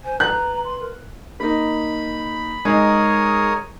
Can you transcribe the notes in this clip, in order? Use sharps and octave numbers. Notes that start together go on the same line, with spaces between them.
C5 G#5
B4 A#5 F#6
C6
A#4
A#3 D#4 B5
G#3 D#4 A#4 C#5 D#6